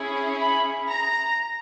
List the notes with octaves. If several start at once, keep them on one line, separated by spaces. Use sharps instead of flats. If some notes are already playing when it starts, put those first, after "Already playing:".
Already playing: C#4 E4 G#4
B5
A#5